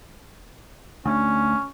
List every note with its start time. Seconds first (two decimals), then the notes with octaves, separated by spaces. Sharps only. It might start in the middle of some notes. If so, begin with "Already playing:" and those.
1.06 D2 C#4